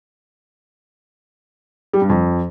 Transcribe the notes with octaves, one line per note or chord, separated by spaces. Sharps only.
G3
G2
F2